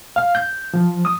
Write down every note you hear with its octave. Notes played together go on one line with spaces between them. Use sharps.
F5
G6
F3
D#6